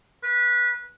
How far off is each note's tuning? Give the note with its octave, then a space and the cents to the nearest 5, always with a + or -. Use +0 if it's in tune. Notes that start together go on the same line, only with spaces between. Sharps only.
B4 -20